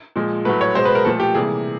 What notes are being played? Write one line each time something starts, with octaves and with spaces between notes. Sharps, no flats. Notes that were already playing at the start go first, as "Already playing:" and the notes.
A#2 F3 G#3
A2 F#3 A3 B4
C#5
B2 G#3 C5
B4
A#4
A#2 F3 A3 A4
G4
C3 E3 G3 A#3 G#4